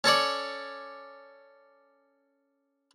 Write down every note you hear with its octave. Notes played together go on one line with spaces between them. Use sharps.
C#4 A4 C#5 D5